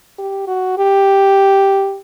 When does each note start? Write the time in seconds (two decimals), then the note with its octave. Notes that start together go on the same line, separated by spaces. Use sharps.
0.18 G4
0.47 F#4
0.78 G4